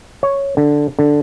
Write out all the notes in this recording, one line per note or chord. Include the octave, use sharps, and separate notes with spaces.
C#5
D3
D3